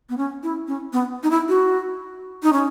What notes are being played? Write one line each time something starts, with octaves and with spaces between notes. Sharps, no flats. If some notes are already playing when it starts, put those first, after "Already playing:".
B3
C#4
E4
C#4
B3
D#4
E4
F#4
D#4
C#4